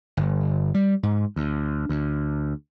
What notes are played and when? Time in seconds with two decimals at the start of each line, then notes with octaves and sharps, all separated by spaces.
0.17 G1
0.74 G3
1.03 G#2
1.36 D2
1.89 D2